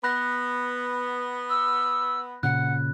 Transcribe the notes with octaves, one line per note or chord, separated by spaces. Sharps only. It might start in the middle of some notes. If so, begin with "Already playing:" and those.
B3 B5 F#6 A#6
E6
A#2 C#3 F#5 F#6